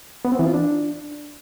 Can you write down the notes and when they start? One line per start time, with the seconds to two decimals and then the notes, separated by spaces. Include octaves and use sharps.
0.25 B3
0.32 C4
0.39 E3
0.47 F4
0.54 D4